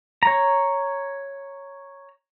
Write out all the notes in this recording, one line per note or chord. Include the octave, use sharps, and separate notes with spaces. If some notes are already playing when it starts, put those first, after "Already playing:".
C#5 A#5